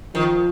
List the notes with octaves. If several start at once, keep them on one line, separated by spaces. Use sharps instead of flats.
D#3 F3